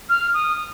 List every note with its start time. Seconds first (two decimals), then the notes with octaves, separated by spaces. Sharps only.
0.09 F6
0.34 D#6